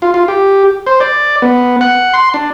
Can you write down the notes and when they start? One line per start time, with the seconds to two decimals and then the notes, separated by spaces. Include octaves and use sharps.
0.02 F4
0.14 F4
0.28 G4
0.87 C5
1.00 D5
1.42 B3
1.81 F#5
2.14 C6
2.34 D4